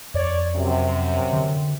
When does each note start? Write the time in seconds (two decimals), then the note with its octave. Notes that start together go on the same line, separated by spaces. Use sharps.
0.14 F2 C#5 D5
0.56 F#2 C3
1.33 D3